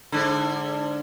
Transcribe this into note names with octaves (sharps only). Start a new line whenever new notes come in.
G#2 D3